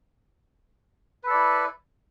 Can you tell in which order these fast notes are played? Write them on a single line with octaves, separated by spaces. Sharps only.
B4 A4 D5 E4